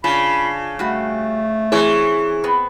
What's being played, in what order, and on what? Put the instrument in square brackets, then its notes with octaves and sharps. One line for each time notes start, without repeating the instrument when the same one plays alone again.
[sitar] C#3 [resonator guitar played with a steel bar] D4 F4 [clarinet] B5
[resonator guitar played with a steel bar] G3 F#4 [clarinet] A3
[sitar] E3 C#5 [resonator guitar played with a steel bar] C4 [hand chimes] E4 G#4
[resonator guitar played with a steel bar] B3 C4